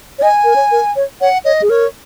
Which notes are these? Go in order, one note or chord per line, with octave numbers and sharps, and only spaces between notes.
C#5
D#5 G#5
A#4
C#5
A#4
C#5
C#5 F#5
C#5 D#5
G#4
A#4 C#5